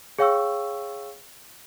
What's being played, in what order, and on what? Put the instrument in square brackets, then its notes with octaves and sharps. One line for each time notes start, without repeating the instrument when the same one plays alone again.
[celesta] G#4 C#5 F5 G5 C#6 E6